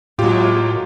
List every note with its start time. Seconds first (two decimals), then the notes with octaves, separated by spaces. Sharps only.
0.19 A2 F#3 G#3 A#3 F4 G4